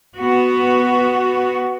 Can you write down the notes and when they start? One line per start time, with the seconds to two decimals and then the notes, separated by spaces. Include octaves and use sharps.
0.17 B3 F#4